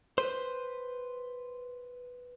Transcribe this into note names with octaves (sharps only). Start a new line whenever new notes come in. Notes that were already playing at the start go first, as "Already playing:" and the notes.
B4 C5